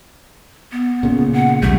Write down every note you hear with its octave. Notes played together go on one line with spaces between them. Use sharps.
B3
A#2 C#3
F#5
B1 E2 G3 A3